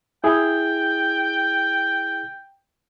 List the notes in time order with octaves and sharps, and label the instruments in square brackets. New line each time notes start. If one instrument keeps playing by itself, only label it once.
[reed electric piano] E4 G#4 [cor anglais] G5